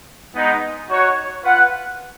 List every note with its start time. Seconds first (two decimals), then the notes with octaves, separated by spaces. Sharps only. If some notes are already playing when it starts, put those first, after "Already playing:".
0.34 G#3 B3 D#4
0.89 D#4 F#4 C#5 F#5
1.42 F4 B4 F#5